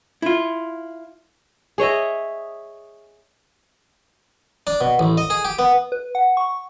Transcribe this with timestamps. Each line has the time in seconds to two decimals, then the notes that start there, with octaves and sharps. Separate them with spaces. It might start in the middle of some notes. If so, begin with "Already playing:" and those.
0.22 E4 F4
1.78 G#4 C#5 D#5 E5
4.67 D4
4.81 B2
4.99 A1
5.18 D#5
5.30 G#4
5.45 G4
5.59 B3
5.92 B4
6.15 F#5
6.37 C#6